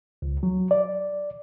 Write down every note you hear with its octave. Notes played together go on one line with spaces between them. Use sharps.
C#2
F#3
D5